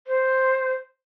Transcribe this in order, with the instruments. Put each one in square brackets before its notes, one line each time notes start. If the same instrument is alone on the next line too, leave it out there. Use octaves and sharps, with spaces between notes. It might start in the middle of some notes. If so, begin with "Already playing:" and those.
[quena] C5